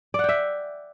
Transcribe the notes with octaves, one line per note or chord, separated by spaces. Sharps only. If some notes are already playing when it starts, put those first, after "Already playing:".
D5 E5 F#5 G5